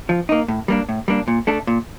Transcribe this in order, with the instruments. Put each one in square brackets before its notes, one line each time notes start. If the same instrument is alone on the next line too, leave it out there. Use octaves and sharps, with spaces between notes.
[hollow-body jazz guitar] F3
A#3 D#4
A2
G3 A#3 D4
A2
G3 A#3 D4
A#2
A3 D4 A4
A#2